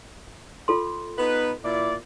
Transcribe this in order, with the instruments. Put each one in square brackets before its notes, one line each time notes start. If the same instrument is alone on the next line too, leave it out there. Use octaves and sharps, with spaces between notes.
[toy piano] F4 A4 C6
[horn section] B3 D#4 B4
A#2 E4 D5